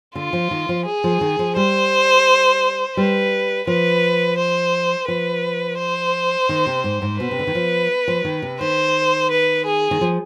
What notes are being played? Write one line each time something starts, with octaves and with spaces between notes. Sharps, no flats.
D3 F4
F3
D#3
F3
G#4
F3
D#3
F3
G3 C5
G3 B4
F3 B4
C5
F3 B4
C5
D#3
C3
G#2
G#2
B2 B4
C3
D3
D#3
F3
F3
D#3
C3
D#3 C5
B4
G#4
D#3
F3